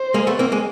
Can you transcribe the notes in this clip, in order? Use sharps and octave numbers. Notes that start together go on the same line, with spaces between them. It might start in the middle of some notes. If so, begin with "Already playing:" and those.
Already playing: C5
G#3 A#3
A3 B3
A#3 C4
G#3 A#3